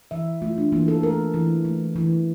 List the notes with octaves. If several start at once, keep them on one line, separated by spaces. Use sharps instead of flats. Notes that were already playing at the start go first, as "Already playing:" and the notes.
E3 E5
A3 F4
D4
E3 A#3
A4
A3 A#4
E3
A3
E3